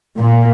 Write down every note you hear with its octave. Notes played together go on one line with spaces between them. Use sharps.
A#2